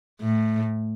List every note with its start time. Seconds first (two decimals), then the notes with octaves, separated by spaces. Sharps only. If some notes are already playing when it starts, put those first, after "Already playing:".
0.21 A2